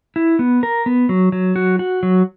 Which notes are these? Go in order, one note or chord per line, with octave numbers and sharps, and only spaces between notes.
E4
B3
A#4
B3
F#3
F#3
F#4
F#4
F#3